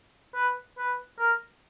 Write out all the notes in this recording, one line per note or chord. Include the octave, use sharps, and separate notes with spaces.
B4
B4
A#4